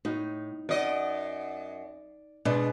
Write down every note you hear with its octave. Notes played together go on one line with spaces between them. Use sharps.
A2 D#4
F#2 D5 D#5
B2 G#3 D4 D#5